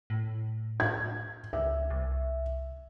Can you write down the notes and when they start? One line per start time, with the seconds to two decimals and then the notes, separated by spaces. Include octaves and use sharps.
0.10 A2
0.80 G#6
1.53 C#2 E5
1.90 C2